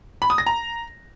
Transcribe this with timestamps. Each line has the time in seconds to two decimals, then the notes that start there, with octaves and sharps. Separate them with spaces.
0.22 B5
0.30 D#6
0.38 A#6
0.46 A#5